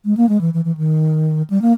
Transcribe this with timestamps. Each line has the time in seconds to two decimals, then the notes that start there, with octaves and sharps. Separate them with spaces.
0.05 G#3
0.17 A#3
0.29 G#3
0.41 E3
0.54 E3
0.65 E3
0.77 D#3
1.50 G3
1.62 A#3